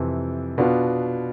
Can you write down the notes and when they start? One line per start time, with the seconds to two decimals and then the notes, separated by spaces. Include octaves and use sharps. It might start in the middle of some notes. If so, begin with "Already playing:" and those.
Already playing: F2 C3 E3
0.58 B2 B3 D4 F4